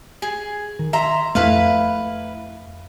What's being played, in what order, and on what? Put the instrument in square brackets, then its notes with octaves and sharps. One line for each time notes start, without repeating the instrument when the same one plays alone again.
[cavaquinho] G#4
[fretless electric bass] D#3
[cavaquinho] E5 A#5 C6
[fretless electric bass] F2 A3 [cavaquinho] E4 B4 F5